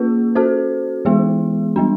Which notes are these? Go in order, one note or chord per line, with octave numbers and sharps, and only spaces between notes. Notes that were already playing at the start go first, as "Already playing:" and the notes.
Already playing: A#3 C#4 F4 G#4 B4
C#4 F#4 A4 C5
E3 G#3 B3 E4 G#4
G3 B3 D4